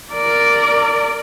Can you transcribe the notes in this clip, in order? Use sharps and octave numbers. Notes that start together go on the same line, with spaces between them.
A#4 D5